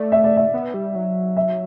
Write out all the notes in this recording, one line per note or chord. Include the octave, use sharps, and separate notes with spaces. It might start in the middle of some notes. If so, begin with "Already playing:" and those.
Already playing: A3 D5
E5
D5
E5
B3
G3
F#3
E5